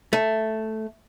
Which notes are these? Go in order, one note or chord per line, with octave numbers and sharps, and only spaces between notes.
A3